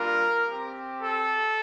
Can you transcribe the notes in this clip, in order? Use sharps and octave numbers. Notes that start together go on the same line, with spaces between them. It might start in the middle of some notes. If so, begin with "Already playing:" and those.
Already playing: G3 A#3 D4 F4 A#4
C4 G4
A4